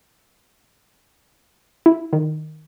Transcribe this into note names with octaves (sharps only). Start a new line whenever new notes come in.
E4
D#3